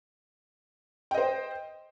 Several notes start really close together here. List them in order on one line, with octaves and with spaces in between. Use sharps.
G5 D#5 C5